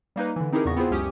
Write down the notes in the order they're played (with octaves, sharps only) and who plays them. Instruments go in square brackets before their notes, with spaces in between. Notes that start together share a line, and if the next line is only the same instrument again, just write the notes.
[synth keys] G3 A#3 D#4 B4
D3 E3
C4 D#4 E4 G4 G#4 A#4
E2 A#2 C#3 B3 C#6 A#6
B3 C4 E4 F4 G#4 C5
C#2 F#2 C#4 G4 C#6 D#6